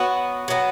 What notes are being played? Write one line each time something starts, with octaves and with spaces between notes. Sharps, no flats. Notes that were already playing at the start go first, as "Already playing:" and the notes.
Already playing: F#3 B3 F#4
F#3 B3 F#4